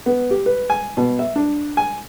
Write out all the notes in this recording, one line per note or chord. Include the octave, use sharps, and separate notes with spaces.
B3
G4
B4
G#5
B2
E5
D4
G#5